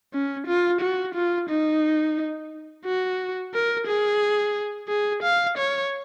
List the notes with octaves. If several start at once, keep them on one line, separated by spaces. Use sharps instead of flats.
C#4
F4
F#4
F4
D#4
F#4
A#4
G#4
G#4
F5
C#5